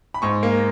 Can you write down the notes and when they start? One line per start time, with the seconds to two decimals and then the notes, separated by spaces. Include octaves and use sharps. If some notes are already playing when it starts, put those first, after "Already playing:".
0.14 B5
0.22 G#2 C#6
0.43 A#3